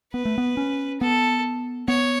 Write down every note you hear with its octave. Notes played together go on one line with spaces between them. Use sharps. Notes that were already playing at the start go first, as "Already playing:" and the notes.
B3 B4
A3
B3
C#4
B3 A4
B3 C#5